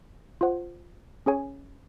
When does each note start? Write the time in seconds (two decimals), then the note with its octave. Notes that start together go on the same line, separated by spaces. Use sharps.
0.41 F4 C5 F#5
1.26 C#4 G#4 C#5 G#5